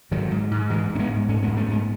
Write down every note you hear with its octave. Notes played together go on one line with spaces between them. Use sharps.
G#2 D#3 F#3
G#2
G#2
G#2 E3 G#3
G#2
C#4
G#3 B3
G#2
G#2 A3 C#4
G#3 B3
G#2
A3 C#4
G#2 G#3 B3